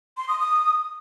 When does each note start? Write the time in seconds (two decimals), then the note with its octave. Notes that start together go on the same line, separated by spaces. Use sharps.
0.17 C6
0.28 D#6
0.40 D#6